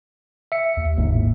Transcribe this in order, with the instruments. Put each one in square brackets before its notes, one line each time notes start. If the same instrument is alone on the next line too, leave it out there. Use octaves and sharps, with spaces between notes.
[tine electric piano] E5 C#7
[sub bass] D#2
[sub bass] G1 [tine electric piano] D#2 G#2
[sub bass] A2